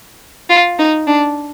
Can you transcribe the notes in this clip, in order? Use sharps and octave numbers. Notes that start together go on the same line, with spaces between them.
F4
D#4
D4